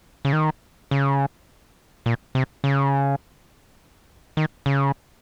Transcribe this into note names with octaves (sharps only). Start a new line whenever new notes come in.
C#3
D#3
C#3
A#2
C3
C#3
D#3
C#3